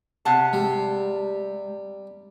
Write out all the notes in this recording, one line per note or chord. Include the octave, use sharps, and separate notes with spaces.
C3 F#5 A5
G3 G#3